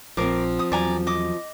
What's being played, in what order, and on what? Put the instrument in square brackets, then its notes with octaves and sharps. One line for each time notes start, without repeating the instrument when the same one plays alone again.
[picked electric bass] A#1 [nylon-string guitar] F3 C4 [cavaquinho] A#4 D6
[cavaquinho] D#6
[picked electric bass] E2 F#3 [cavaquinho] D5 G#5 A#5
[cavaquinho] D#5 D6 D#6